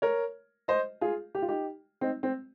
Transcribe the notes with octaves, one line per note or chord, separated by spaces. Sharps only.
A#4 C#5
C5 D#5
F4 G#4
G4
F4
D#4 G4
C4 D#4
C4